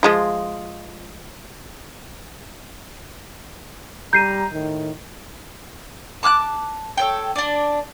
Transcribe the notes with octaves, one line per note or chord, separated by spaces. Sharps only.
F3 G#3 F4
G3 A#5 G6 C7 D#7
A2 D#3
A5 D6 F6 F#6
A4 C#5 G5
D4 D5